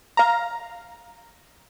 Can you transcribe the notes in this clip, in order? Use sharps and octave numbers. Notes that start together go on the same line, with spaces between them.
F5 A#5